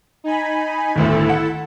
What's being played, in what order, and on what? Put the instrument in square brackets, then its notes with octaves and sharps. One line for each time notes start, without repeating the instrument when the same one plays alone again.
[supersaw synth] D#4 G#5 B5
[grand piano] G1 D2 A2 [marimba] D#3 [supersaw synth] E4 A4
[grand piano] F#5